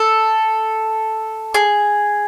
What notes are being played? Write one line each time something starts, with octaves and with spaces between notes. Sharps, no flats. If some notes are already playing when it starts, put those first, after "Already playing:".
Already playing: A4
G#4